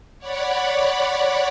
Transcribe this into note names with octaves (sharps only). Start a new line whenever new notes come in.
C#5 D5 F#5 B5